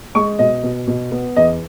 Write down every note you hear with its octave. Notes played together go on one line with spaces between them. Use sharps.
G#3 C#6
B2 D#5
B2
B2
B3
E2 D#5